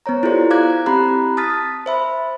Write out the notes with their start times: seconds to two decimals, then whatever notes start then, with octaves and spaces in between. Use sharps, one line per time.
0.06 B3 C5 C#5 A#5
0.23 E4 F4 G4 A4 C5 D5
0.50 F5 A#5 D6 F#6 G#6
0.86 C4 E4 G4 A#5 B5 F#6
1.37 A5 D#6 F6 A6 B6
1.86 C5 E5 B5